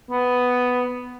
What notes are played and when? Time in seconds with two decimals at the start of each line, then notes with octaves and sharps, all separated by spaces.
0.11 B3